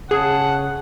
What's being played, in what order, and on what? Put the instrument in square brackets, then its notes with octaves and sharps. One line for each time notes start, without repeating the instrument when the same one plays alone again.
[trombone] C#3 [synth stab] G#4 [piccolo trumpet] F#5 [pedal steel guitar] A5 D#6